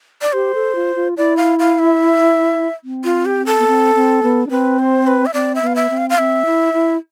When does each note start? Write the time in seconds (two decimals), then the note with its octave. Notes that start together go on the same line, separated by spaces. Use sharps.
0.22 D5
0.33 G4 C5
0.54 A4
0.75 F4
0.96 F4
1.17 E4 D5
1.37 F5
1.59 F5
1.79 E5
2.84 C4
3.04 F4
3.26 G4
3.46 A4
3.59 B3
3.67 C4
3.95 C4
4.23 B3
4.47 D4
4.50 C4 B4
4.79 C5
5.07 B4
5.26 E5
5.34 C4 D5
5.55 E5
5.62 B3
5.67 F5
5.76 E5
5.90 C4
5.98 F5
6.10 F5
6.18 C4 E5
6.45 E4
6.73 E4